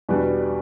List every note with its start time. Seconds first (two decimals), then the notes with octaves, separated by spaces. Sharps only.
0.09 E2 B2 G3 D4 B4